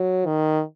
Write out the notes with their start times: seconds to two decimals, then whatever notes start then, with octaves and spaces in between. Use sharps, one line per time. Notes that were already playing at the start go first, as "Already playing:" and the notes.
Already playing: F#3
0.26 D#3